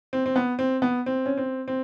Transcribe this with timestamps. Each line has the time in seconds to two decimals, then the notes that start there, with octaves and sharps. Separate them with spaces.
0.13 C4
0.26 C4
0.36 B3
0.59 C4
0.82 B3
1.06 C4
1.26 C#4
1.37 C4
1.68 C4